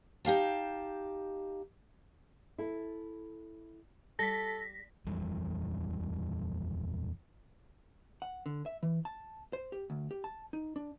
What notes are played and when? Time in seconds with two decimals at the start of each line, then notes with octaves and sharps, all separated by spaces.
0.25 D#4 G4 F5 A5
2.58 E4 A4
4.19 G3 A4 A#6 B6
5.06 D#1 F2 E3 G3
8.22 F#5
8.46 D3
8.66 E5
8.83 E3
9.05 A5
9.53 C5
9.72 G4
9.90 D2
10.11 G4
10.24 A5
10.53 D#4
10.76 D4